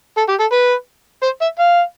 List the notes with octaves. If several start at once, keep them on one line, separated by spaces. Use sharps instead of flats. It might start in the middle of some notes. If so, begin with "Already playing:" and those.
A4
G4
A4
B4
C5
E5
F5